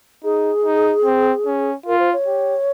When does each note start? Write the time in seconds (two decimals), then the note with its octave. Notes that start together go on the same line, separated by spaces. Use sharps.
0.23 D#4 G#4
0.65 D#4
1.04 C4
1.46 C#4
1.86 F4 A#4
1.99 C5
2.13 C#5
2.27 G4